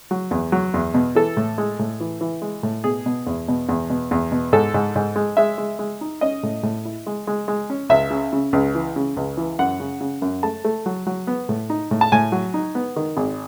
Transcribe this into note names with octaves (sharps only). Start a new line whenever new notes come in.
F#3
E2
F#3
E2
B2
E3 A4
A2
G#3
A2
E3
E3
G#3
A2
B2 G#4
B2
E2
B2
E2
B2
E2
B2
G#2 A4
G#2
G#2
G#3
G#3 E5
G#3
G#3
D#4
C#4 D#5
A2
A2
E4
G#3
G#3
G#3
C#4
C#2 E5
C#3
C#3
C#2
E3
C#3
C#2
E3
F#2 F#5
C#3
C#3
F#2
A3 A5
A3
F#3
F#3
B3
A2
D#4
A2
A5
A2 G#5
F#3
D#4
B3
D#3
G#1